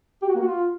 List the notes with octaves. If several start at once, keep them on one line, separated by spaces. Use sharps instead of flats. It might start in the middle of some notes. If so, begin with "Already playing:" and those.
G4
F#4
A#3
F#4
F4